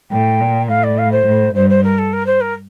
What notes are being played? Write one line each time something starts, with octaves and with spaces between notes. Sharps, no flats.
A2 G5
A#2
A2 F5
D5
F5
C5
A2
G2 C5
C5
A#4
A4
A#4
C5
A#4